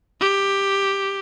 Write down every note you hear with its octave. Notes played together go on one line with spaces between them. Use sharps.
G4